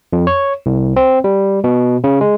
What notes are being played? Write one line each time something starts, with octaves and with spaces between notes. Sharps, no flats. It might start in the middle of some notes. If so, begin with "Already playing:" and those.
F2
C#5
C2
C4
G3
B2
C#3
G#3